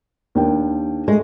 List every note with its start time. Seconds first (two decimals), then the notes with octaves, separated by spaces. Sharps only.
0.35 D#2 D4 G5
1.08 G#3 A3